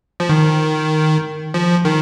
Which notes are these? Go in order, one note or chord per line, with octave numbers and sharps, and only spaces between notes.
F3
D#3
F3
D#3